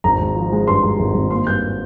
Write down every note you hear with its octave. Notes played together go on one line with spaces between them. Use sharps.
G#1 A#5
G#3
F3
G#3
G2 C6
G#3
G#1
G#1
A#3 C6
G2 G6